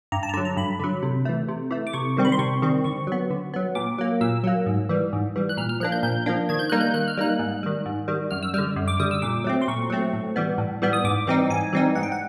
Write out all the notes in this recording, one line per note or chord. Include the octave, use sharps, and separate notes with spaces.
G2 A#5
A5
A#5
D3 F#3 A5
A#5
G2 B5
D3 F#3
C3
E3 A3
C3
E3 A3
D6
C3 C#6
D#3 G3 C4
B5
C6
C3 C#6
D#3 G3 C4
D3 C#6
F#3 B3
D3
F#3 B3
A#2 D6
F#3 A#3
A#2 E6
F#3 A#3
G#2
E3 G3
G#2
E3 G3
F#6
A#2 F6
F6
F3 A#3 D4 F#6
G6
A#2 G6
F3 A#3 D4
D#3 G#6
G6
G3 A#3 D#4 F#6
G6
D#3 F#6
F6
G3 A#3 D#4 F#6
G#2
D#3 G3
G#2
D#3 G3
F#2 F6
E6
D3 G3 F6
F#2
D6
D3 G3 D#6
E6
A#2 D6
F#3 A3 C4
C6
A#2 C#6
F#3 A3 C4
A2
E3 G3 B3
A2
E3 G3 B3
D#6
G#2 D6
E3 G3 C4 D#4
G#2 G#5
E3 G3 C4 D#4
G#2 F#5
G5
F#5